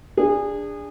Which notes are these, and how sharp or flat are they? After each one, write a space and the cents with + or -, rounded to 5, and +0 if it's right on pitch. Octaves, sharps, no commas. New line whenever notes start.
D4 +0 G#4 -25